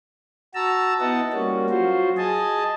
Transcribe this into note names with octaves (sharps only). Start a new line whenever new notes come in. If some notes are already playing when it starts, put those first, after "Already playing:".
F#4 A5 A#5 E6
B3 D#4 E4 D#5 F#5 A5
G3 A#3 C#4 F#4
F#3 F4 F#4 C5
G#4 D#5 G#5 A5